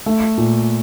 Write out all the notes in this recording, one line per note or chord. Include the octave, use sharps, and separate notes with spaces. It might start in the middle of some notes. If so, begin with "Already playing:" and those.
A3
A#2